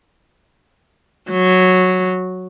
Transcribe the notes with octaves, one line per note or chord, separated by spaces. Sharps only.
F#3